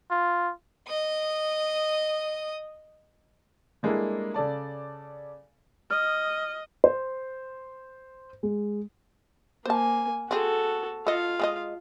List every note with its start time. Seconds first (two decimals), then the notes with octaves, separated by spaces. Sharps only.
0.11 F4
0.88 D#5 D#6
3.83 G3 G#3 A#3 D4 E4 A4
4.34 C#3 A4 D5 A5
5.91 D#5 D#6 F6
6.84 C5
8.43 G#3
9.66 A#3 C5 G#5 A5
10.31 C4 F#4 G#4 A4
11.07 F4 A4 D#5 F5
11.40 G#3 G#4 D#5